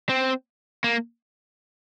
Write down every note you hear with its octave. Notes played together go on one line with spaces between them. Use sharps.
C4
A#3